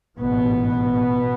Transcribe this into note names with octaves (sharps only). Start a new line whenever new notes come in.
A1 G#2 B2 B3